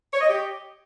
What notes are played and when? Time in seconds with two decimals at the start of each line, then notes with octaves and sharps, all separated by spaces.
0.13 C#5
0.21 D#5
0.29 G4